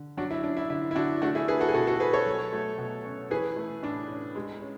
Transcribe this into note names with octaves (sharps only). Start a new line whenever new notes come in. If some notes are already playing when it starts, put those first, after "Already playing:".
Already playing: D3
F#3 D4 F#4
E4
C#4 D4
E4
D3 E4
E4
D3 D4 F#4
A3 D4 F#4
E4 G#4
D4 G#4 B4
F#4 A4
G#4
B2 F#4 A4
F#4 A4
B2 G#4 B4
A4 C#5
F#3
A3
B2
C#4
E3 G#4 B4
A3
A2 D4
C#4
G#3
C#4